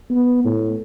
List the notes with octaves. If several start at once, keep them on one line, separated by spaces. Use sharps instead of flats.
B3
A2